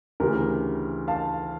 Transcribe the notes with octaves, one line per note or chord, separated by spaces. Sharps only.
D2 C#3 E3 G4 A#4
F5 A5